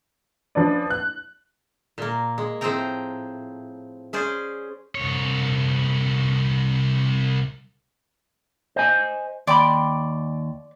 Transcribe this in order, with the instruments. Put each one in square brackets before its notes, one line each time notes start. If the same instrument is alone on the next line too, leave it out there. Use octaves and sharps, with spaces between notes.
[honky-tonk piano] F3 C#4 D4 B4 D5
F#6
[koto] A#2 A#3
G#3
A2 F3 C4 G#4 G5 A#5
C#4 G#4 C5 D5
[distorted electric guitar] C2 C#5
[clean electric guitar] C5 D#5 G#5
[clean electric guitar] D#2 G5 B5 [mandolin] D5 C6 D6